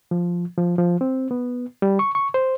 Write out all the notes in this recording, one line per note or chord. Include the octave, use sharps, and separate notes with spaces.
F3
F3
F3
C4
B3
G3
C#6
C#6
C5